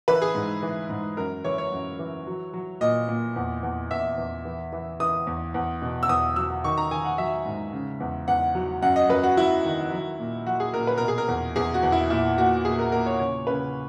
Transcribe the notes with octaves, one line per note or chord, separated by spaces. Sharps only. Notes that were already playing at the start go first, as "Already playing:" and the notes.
E3 B4
G#4
G#2
E3
G#2
F#2 A#4
E3 C#5
C#5
F#2
E3
F#3
F#3
A#2 D#5
A#2
E2
E2
E2 E5
E2
E3
E3
E3 D#6
E2
E2
B2
E6
E2 D#6
F#3 E6
D#3 C#6
A#5
D#3 G#5
F#5
F#3 E5
G#2
C#3
E2
E2 F#5
F#3
F#2 F#5
D#5
F#2 B4
F#4
F#3 E4
D#3
F#3
A#2
F#3 F#4
G#4
A#2 A#4
B4
B2 A#4
G#4
A#4
E2
E2 G#4
F#4
E2
E4
A#2 E4
A#2 F#4
A#2 G#4
A#4
A#2 A#4
C#5
C#3 C#5
C#3 B4